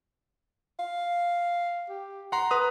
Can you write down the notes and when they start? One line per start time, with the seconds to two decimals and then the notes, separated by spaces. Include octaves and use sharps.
0.79 F5
1.90 G4
2.32 F#5 A#5 C6
2.51 B4 A#5 D#6